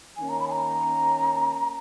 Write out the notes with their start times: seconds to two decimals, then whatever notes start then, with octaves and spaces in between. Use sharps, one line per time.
0.17 D#3 A#3 C#4 G#5
0.29 A#5
0.40 B5
0.48 G#5
0.52 A#5